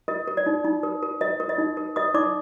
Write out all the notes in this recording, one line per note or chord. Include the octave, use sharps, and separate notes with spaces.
A#4 D#5
A#4
D5
D#4
D#4
A#4
A#4
A#4 D#5
A#4
D#5
D#4
A#4
A#4 D#5 D#6
D#4 D5 D6